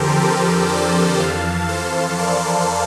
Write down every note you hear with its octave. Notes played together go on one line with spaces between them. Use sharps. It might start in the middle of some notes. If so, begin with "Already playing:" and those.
Already playing: F2 D3 F3 G4 A4 A#4 C5
A4 C5
A#4 D5
F2 E3 F5 A5
A4 C5
A#4 D5